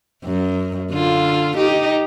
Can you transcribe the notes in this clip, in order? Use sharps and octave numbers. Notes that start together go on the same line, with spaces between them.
F#2
D3 F4
D#4 G4